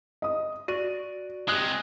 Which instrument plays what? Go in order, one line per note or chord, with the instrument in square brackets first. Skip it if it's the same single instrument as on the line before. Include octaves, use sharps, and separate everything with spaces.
[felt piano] D#5 D#6
[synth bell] F#4 D5 [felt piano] D#7
[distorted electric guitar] C3 G#3 [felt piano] D#6 F#6